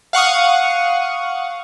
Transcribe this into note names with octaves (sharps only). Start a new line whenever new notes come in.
F5 F#5 C#6 D#6